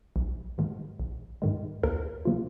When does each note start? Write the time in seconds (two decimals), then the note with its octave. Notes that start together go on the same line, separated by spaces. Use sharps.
0.16 A#1
0.58 G#2 D#3 G#3
1.00 A#1
1.42 G#2 D#3 G#3
1.83 D#2 A#4
2.25 C#3 F3 A#3 F4